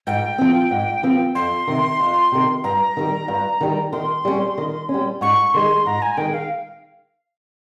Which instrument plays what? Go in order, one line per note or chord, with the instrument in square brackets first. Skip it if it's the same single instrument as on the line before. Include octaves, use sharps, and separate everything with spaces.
[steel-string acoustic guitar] G#2 [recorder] G5
[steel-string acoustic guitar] F3 C4
G#2
F3 C4
[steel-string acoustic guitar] F2 [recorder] C6
[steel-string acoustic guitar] C3 D#3
F2
C3 D#3
[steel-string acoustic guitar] G2 [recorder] A#5
[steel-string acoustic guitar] D#3 G3
G2
D#3 G3
[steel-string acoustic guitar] D#3 [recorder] C6
[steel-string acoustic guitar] G3 C#4
D#3
C#4
G3
[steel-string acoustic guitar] G#2 [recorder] C#6
[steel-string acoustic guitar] D#3 G#3 [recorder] C6
[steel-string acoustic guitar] G#2 [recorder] A#5
[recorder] G#5
[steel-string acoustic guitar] D#3 G#3 [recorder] G5
[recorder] F5